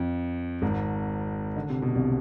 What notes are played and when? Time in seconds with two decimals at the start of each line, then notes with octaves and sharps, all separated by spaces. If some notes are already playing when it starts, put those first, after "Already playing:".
Already playing: F2
0.62 G#1 G#2
1.56 D3
1.70 C3
1.82 B2
1.95 C2 C3